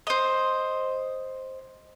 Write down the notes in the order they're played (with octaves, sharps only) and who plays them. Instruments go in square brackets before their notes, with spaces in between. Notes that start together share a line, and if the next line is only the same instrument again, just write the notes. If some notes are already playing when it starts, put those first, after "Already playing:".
[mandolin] C5 D#5